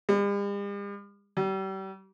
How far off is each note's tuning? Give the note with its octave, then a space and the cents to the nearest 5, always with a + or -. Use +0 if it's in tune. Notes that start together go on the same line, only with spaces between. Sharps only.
G3 +45
G3 -35